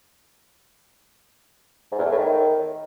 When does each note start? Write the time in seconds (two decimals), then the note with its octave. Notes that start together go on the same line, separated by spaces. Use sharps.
1.92 G#2
1.98 E2
2.05 A3
2.12 A2
2.18 D#3